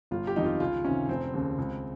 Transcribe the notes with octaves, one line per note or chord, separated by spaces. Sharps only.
G1 F4
G4
F2 D#3 D#4
F4
C#2 F4
C3 D#3 C#4
F1 C4
D#2 C#3
C#2